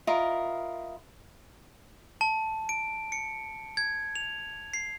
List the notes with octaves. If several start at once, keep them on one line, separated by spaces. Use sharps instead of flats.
E4 F4 A#4 D#5
A5
D7
C#7
G#6
F7
C7